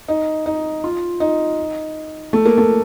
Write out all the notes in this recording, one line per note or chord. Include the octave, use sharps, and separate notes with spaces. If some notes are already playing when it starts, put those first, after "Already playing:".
D#4
D#4
F4
D#4
A3
A#3
A3